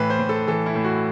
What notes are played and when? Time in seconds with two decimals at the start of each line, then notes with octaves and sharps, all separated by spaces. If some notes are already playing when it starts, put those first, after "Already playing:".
Already playing: A2 E3 B4
0.10 C5
0.19 A2
0.29 A4
0.47 E3 A4
0.66 E4
0.75 A2
0.84 F#4